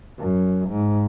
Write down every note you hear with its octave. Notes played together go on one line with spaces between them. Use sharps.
F#2
G#2